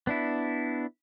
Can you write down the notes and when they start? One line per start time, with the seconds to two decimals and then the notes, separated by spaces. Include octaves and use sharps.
0.07 B3 D4 E4